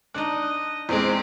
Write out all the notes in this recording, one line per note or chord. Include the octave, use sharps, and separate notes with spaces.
D4 D#4 D#5 F#6
E2 G#3 C4 G4 C5